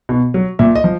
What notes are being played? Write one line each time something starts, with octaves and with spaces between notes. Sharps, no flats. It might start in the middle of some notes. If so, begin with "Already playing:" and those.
B2
F#3
A#2 E5
D#5
F3